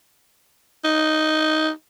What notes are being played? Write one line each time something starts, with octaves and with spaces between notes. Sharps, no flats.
D#4